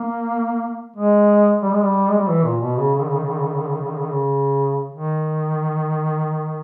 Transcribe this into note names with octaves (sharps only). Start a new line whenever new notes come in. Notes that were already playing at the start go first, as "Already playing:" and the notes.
Already playing: A#3
G#3
G3
G#3
G3
G#3
G3
E3
A#2
B2
C#3
C#3
D#3
C#3
D#3
C#3
D#3
C#3
D#3
C#3
D#3
C#3
D#3
C#3
D#3
C#3
D#3
C#3
D#3